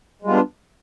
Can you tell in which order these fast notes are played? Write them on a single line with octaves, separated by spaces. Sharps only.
G#3 G3 F4 B3 D4